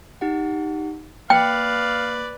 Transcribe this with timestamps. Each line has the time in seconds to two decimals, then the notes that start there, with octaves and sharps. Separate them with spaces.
0.21 D#4 G4 F#5
1.30 A#3 B4 D5 F5 G5